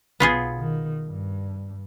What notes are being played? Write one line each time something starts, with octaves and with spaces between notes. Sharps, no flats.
B1 B2 B3 F4 G#4
D#3
G2